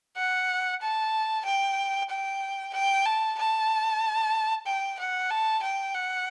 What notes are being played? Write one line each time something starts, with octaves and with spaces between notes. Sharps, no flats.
F#5
A5
G5
G5
G5
A5
A5
G5
F#5
A5
G5
F#5